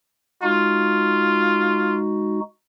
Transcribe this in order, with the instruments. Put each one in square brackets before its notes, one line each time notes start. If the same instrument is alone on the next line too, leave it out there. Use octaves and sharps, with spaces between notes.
[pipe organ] G#3 D#4 F#4 [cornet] F4